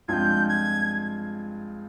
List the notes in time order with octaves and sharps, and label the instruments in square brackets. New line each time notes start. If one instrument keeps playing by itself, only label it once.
[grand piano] G2 F3 G#3 C4 F4 [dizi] G6 G#6
[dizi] G#6